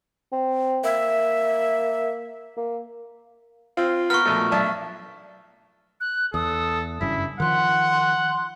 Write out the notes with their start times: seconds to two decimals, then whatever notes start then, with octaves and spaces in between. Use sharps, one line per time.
0.33 C4
0.84 A#3 E5
2.57 A#3
3.77 C4 F4
4.10 B3 A#4 C#6 F6
4.25 A#1 B2 A3
4.51 B1 D4 E5 A5
6.01 F#6
6.34 E2 A4 D#6
7.01 F#1 G2 C#4 E4 B6
7.40 D#3 F3 F#5 C6 F#6